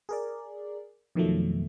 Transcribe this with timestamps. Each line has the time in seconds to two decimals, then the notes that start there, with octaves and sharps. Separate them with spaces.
0.09 G#4 A#4 D5
1.15 F2 B2 D#3 F3 F#3 A3